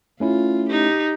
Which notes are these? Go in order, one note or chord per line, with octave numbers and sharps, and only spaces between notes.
A3 C#4 E4 F4
D#4 G4